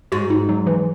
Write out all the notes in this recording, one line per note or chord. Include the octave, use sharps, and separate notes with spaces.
G#2 F#4
D#4
F#3
E3